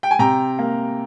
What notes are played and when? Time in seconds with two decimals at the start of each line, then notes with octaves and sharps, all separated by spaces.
0.03 G5
0.11 G#5
0.19 C3 G5 A#5
0.59 A#3